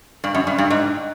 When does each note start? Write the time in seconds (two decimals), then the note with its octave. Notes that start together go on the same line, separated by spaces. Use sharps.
0.24 G2
0.34 F#2
0.47 G2
0.58 G2
0.70 G#2